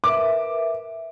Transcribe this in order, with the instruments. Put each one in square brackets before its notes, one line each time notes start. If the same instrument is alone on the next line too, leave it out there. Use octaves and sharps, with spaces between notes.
[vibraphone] A#4 B4 E5 [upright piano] D6